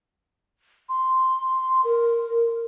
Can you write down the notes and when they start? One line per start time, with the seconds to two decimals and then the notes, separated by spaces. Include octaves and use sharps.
0.89 C6
1.84 A#4